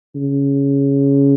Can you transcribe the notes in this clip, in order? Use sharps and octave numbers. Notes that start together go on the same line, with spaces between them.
C#3